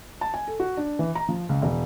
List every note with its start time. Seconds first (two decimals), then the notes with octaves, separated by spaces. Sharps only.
0.21 A5
0.34 G#5
0.48 A4
0.60 F#4
0.77 D4
0.99 E3
1.15 A#5
1.29 F3
1.49 C#2
1.62 E1